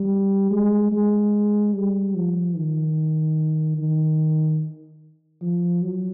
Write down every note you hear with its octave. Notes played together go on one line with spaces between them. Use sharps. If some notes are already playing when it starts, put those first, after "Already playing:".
Already playing: G3
G#3
G#3
G3
F3
D#3
D#3
F3
F#3